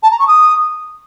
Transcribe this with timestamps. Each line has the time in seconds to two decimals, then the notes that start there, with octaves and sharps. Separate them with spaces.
0.03 A5
0.11 A#5
0.19 C#6
0.28 D#6